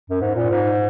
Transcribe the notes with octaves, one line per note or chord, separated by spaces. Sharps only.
F#2
G#2
A#2
G#2